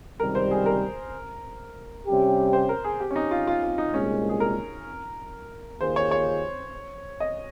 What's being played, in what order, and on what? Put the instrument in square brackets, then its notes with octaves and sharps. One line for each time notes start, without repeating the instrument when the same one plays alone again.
[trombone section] C#2 C3 D#3 G3 [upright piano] A#4
[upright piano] C5
G#4
A#4
[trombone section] C3 G3 C#4 G4
[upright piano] C5
A#4
G#4
G4
C#4
D#4
F4
F4
F4
D#4
[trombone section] C2 A#2 G#3 [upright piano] C#4
[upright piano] G#4
A#4
[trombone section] D#2 D#3 A#3 F4 G#4 [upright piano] C5
[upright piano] C#5
C#5
D#5